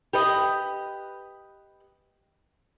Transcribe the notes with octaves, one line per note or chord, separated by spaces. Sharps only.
G4 B4 D#5